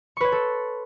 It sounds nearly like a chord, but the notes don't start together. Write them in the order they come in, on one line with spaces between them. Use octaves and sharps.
C#6 B4 C#5 C6 A4